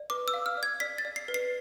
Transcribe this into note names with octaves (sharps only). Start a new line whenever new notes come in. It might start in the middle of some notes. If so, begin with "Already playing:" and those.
Already playing: D5
B4 D6
E6
F5
F6
D5
G#6
D5 B6
A6
D5
C7
B4
C7